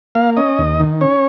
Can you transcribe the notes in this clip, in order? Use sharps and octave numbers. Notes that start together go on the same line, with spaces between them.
A#3 F5
C#4 D#5
D#2
D#3
C#4 C#5